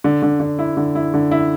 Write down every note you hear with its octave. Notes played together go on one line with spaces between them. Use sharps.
D3
D3
D3
E4
D3
E4
D3
E4